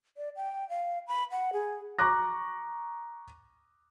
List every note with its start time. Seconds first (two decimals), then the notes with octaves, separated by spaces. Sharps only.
0.17 D5
0.36 G5
0.69 F5
1.08 B5
1.31 F#5
1.53 G#4
1.99 A#5 C#6 D6 F#6 A#6